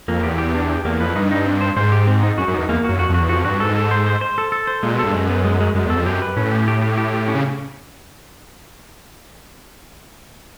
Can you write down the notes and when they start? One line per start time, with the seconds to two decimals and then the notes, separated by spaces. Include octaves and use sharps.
0.08 F2 A#3
0.23 E2 G4
0.38 G4
0.55 D4
0.70 G4
0.85 E2 A#3
1.00 F2 B4
1.15 G2 D#4
1.31 D#4
1.46 C4
1.61 C5
1.76 G#2 C5
1.92 G4
2.07 C4
2.23 D#4
2.38 F#2 F#4
2.48 F#2
2.54 E2 D#4
2.69 E2 A#3
2.84 F#2 F#4
2.99 F2 F#4
3.09 F2
3.14 F#4
3.20 E2
3.29 F2 F#4
3.45 G2 F#4
3.60 G#2 A4
3.76 A4
3.91 C5
4.07 C5
4.21 C5
4.38 A4
4.52 A4
4.67 C5
4.83 A#2 G#3
4.94 B2
4.99 G2 A4
5.13 F#2 G#3
5.29 B3
5.45 G#3
5.60 G#3
5.75 F#2 G#3
5.85 E2
5.90 A4
5.96 F2
6.06 F#2 G4
6.22 B4
6.37 A2 C#4
6.52 G4
6.68 G4
6.82 G4
6.98 G4
7.13 G4
7.28 C#4
7.35 C#3